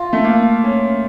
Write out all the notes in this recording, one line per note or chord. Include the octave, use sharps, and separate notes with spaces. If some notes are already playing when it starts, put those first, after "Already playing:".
Already playing: F4
A3
A#3
C#4